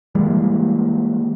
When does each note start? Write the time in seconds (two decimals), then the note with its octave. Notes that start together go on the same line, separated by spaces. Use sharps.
0.15 E3 G3 G#3 A#3